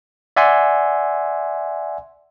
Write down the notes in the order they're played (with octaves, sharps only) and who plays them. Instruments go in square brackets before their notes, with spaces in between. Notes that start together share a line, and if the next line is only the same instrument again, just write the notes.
[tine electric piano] D5 E5 F#5 G#5 C6